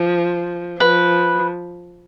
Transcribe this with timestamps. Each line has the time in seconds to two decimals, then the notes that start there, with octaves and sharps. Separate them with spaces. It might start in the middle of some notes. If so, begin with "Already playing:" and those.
Already playing: F3
0.80 F3 B4